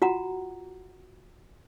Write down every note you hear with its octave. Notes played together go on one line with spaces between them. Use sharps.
F4 F#4 F#5 A#5